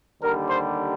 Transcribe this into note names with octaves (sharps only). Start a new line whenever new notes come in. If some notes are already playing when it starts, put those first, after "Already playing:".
D#2 D3 G3 A#4
C5